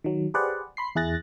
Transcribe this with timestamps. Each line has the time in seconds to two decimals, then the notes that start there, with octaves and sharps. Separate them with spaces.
0.04 D#3 F#3
0.34 G4 G#4 B4 C5 D5 F#5
0.77 B5 C6 C7
0.95 E2 E4 G#4 F#6 A6 A#6